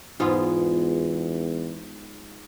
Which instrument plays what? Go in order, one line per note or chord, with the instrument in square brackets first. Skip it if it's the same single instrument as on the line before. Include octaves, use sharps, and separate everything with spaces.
[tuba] E2 [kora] G#2 G#3 B3 [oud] F4